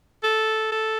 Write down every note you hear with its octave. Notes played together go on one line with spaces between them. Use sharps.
A4
A4